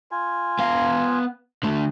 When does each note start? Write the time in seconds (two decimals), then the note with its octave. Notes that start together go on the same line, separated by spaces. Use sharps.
0.11 F4 G#5
0.59 B3 F5
1.63 D3 A3